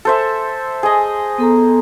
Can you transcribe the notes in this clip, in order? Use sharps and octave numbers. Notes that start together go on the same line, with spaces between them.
A4 C5 E5
G#4 D#5
B3 A4 A#5